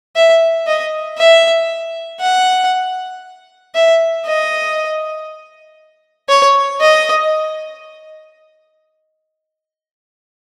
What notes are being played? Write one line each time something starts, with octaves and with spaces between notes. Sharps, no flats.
E5
D#5
E5
F#5
E5
D#5
C#5
D#5